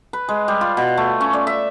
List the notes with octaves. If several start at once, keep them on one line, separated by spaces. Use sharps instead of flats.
B4
G#3
G3
F4
B2
A3
C#4
D5
E5